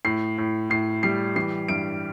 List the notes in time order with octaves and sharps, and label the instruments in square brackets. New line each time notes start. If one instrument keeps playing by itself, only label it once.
[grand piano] A2 C7
A2
A2 C7
G3 C7
E3 C7
G2 D7